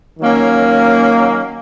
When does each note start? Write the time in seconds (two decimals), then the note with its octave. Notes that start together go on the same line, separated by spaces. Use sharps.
0.20 D#3 F#3 A#3 C#4